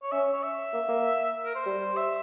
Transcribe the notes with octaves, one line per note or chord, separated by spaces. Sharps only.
C#5
C#4 E5
C#5
E5
A#3
A#3
A#4
C5
G3
E5